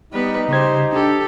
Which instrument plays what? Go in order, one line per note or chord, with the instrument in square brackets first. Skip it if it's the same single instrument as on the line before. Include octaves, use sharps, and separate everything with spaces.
[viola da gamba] G3 B3 B4 [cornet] D#4
[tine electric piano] C#3 G#6 [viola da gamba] G4 C5
[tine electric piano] D4 [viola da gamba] G4 A4